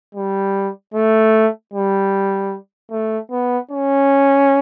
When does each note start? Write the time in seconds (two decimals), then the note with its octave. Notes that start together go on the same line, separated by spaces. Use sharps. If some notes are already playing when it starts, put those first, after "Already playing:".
0.15 G3
0.94 A3
1.74 G3
2.91 A3
3.31 B3
3.71 C#4